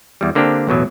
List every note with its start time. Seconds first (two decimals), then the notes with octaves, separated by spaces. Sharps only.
0.21 E2 G3
0.35 D3 A#3 C4 D4 G4
0.67 A1 E2 B2 F#3